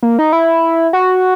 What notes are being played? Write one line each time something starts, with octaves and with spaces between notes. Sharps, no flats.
A#3
D#4
E4
F#4